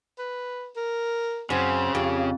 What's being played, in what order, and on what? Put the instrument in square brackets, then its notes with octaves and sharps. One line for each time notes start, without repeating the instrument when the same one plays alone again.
[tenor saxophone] B4
A#4
[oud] F#2 [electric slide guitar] C#3 [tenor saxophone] C4
[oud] F2 [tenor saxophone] G4